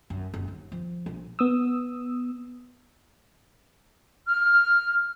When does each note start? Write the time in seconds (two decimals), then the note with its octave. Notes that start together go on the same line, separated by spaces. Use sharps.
0.10 F#2
0.34 F#1
0.48 D#2
0.72 F3
1.06 A#1
1.39 B3 D#6 E6
4.26 F6